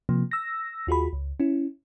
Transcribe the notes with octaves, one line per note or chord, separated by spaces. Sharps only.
C3 F3 A#3
E6 A#6
D#2 F4 F#4 G#4 B5
C#2
C#4 E4